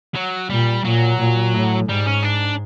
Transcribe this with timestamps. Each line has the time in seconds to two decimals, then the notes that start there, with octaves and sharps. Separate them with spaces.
0.15 F#3
0.50 A#2 G3
0.84 A#2 F#3
1.20 A#2
1.54 A2
1.89 G#2 G3
2.07 C#4
2.23 D4